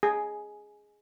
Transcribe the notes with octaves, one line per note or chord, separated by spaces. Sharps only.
G#4